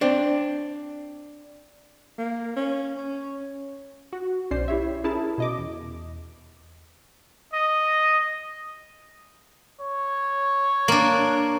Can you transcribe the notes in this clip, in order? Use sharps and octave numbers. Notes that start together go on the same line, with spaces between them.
C4 D4
A#3
C#4
C#4
F#4
B1 C#4 C5 D5 C7
E4 G4 C#5 E5
C#4 E4 G#4 A#4 A5
B2 D#5 D6
E2
D#5
C#5
A#3 D4